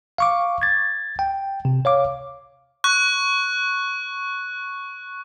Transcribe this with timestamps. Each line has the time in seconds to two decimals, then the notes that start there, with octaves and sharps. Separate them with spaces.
0.18 F5 C#6 D6
0.62 G#6 A6
1.19 G5
1.65 C3
1.85 C#5 F5 D6
2.84 C#6 F#6